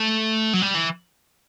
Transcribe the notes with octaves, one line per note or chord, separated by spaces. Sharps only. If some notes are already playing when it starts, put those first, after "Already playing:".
Already playing: A3
F#3
G3
E3